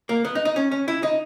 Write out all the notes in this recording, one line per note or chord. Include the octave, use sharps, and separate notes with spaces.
A#3
B3
D#4
D#4
C#4
C#4
E4
D#4